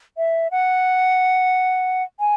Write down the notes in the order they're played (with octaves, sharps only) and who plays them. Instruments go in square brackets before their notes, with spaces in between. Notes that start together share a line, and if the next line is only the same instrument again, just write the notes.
[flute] E5
F#5
G#5